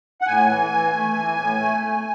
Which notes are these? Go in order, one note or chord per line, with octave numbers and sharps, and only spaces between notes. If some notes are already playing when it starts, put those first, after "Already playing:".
F#5
A2 G#5
E3
E3
A3
E3
A2
A3
A3